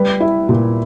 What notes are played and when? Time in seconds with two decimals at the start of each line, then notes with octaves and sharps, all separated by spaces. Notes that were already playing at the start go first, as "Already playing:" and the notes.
Already playing: G3 B4
0.20 E4
0.49 A#2